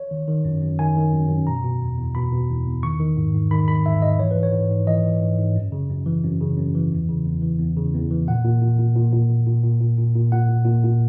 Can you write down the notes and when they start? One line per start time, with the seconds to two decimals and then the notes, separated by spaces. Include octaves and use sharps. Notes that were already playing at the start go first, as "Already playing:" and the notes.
Already playing: C#5
0.11 D#3
0.28 D#3
0.45 F#2
0.63 F#2
0.79 D#3 G#5
0.96 D#3
1.13 F#2
1.29 F#2
1.47 B2 A#5
1.64 B2
1.81 E2
1.98 E2
2.15 B2 B5
2.32 B2
2.49 E2
2.66 E2
2.83 D#3 C#6
3.00 D#3
3.17 G#2
3.34 G#2
3.51 D#3 B5
3.68 D#3 B5
3.85 G#2 E5
4.02 G#2 D#5
4.19 E3 C#5
4.31 B4
4.36 E3
4.43 C#5
4.53 G#2
4.71 G#2
4.87 E3 D#5
5.04 E3
5.21 G#2
5.38 G#2
5.56 F#2
5.72 C#3
5.90 F#2
6.06 E3
6.24 F#2
6.41 C#3
6.58 F#2
6.75 E3
6.92 E2
7.09 C#3
7.26 E2
7.42 E3
7.59 E2
7.77 C#3
7.94 E2
8.11 E3
8.27 A#2 F#5
8.44 A#2
8.61 A#2
8.79 A#2
8.96 A#2
9.13 A#2
9.30 A#2
9.47 A#2
9.64 A#2
9.81 A#2
9.98 A#2
10.15 A#2
10.32 A#2 F#5
10.49 A#2
10.65 A#2
10.83 A#2